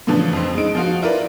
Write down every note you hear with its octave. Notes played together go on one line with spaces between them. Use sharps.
A2 C#3 E3 F3 D4
F2 C5
G#3 D#4 D7
F3 F4 F#4
E4 F4 A#4 B4 D5